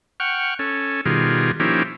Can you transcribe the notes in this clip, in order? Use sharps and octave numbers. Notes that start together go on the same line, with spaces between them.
F#5 G5 C#6 F6
C#4 A4
B2 D#3 G3 F4 G#4
F3 A#3 C#4 D#4 E4 G4